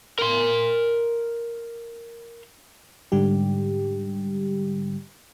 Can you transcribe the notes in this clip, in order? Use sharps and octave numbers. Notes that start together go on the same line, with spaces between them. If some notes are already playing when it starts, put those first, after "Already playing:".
A#4 C6
G#2 D3 G3 G4